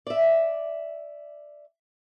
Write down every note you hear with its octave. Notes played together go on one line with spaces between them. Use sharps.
D5 E5